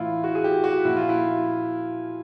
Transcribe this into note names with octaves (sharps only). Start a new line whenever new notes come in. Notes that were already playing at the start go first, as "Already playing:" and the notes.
Already playing: A2 E3 E4 F4
F#4
G#4
G4
F#4
A#2 F3 E4
F4
E4